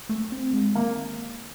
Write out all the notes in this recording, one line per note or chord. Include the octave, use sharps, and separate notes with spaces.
A3
C4
G#3
D#3 A#3